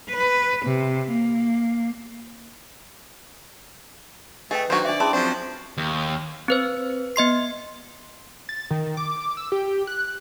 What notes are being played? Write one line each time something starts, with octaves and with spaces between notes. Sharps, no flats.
B4
C3
A#3
A3 G#4 B4 D#5 G5
D#3 F#3 D4 F#4 C5
D4 D5 E5
C#4 E4 G#4 A5 C6
F3 F#3 C4 D4 C5
D#2
C4 B4 C5
B3 D#5 C6 C7
A6
D#3
D6
E6
G4
F#6